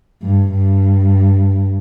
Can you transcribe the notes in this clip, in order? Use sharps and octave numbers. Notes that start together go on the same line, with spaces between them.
G2
G2